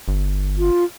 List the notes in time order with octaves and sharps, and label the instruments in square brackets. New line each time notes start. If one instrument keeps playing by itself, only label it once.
[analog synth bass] G1
[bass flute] F4